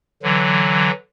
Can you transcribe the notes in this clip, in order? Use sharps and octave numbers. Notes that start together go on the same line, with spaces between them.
D3 E3 F#3